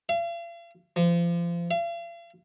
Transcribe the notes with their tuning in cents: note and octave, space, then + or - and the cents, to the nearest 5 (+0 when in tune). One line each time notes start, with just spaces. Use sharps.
F5 -45
F3 -30
F5 -45